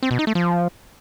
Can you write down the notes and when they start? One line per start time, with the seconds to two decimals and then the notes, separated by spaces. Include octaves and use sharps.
0.03 C4
0.11 B2
0.19 D#4
0.27 A3
0.35 F3